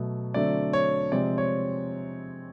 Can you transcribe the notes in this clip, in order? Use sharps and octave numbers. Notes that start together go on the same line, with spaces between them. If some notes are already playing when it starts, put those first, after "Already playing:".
Already playing: B2 F#3 A3
D3 F#3 A3 C4 D5
C#5
C3 F3 G#3 C4 D5
C#5